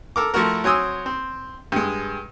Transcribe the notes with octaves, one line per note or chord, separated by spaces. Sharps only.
A4 A#4 D6
F3 A3 E4 F#4 A#4
F#3 C4 G#5 D#6 E6
C4
G2 G#3